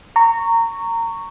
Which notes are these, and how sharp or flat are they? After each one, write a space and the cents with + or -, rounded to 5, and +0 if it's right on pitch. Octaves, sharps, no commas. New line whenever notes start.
A#5 -20 C#6 +0